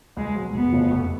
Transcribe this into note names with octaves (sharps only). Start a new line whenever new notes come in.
C#2 G#3
B2 F#3
F1 B3
F2 C#3 F3 A3
F1